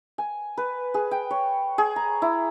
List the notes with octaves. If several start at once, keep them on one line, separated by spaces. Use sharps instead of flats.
G#5
B4
G#4
G5
C#5
G#4
A#5
E4